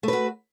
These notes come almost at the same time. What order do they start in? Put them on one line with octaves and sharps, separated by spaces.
A3 B4 F#4